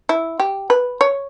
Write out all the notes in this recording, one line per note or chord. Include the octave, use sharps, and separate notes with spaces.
E4
G4
B4
C#5